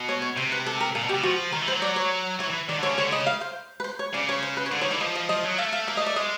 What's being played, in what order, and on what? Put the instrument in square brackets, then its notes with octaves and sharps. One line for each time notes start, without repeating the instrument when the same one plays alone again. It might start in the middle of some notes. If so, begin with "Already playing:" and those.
Already playing: [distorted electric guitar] B2
[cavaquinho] C#5
C#5
[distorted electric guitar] C3 [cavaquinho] C5
[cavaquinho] B4
A4
A#4
[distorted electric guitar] A#2 [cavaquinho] A4
[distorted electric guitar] B2
[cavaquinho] G4
[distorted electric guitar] B2
[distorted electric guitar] F3 [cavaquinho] F#4
[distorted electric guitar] D#3 [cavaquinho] A#4
[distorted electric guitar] E3
[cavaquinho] C5
[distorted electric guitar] F#3
[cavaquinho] D5
C#5
[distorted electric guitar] E3 [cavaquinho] C#5
[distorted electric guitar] E3
[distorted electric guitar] D#3 [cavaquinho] D5
[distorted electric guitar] D3 [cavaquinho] C#5
[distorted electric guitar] C#3
[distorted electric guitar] D3 [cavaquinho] C#5
[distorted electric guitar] C#3 [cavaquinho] D#5
[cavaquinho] F5
C5
B4
C5
C#5
[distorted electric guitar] C#3 [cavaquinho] D5
[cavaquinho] C#5
C5
B4
C#5
[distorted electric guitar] D3 [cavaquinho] C5
[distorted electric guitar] D#3 [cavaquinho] C#5
[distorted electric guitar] E3 [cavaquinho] D5
[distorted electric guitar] F3 [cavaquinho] D#5
[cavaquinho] D#5
[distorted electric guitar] F3 [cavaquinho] D#5
[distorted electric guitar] F#3
[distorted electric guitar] A3 [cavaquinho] F5
[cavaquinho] F5
[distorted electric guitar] A#3 [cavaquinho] E5
[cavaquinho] D#5
[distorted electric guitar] A3 [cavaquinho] D5
[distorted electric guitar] G#3 [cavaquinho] D#5